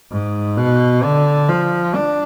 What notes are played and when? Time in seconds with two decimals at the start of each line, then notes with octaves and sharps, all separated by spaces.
0.11 G#2
0.57 B2
1.04 D3
1.49 F3
1.95 D4